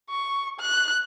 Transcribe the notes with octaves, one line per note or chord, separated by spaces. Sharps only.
C#6
F#6